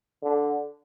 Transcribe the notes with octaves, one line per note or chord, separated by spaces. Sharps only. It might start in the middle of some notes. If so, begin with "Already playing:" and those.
D3